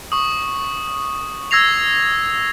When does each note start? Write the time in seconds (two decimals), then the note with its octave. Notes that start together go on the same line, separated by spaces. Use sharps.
0.12 C#6 D#6
1.51 E6 G#6 A#6 C7 F7